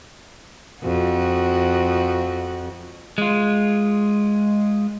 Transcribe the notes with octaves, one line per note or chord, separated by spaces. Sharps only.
F2 F#4
G#3 F4